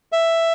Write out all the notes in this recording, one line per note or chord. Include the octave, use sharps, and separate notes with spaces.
E5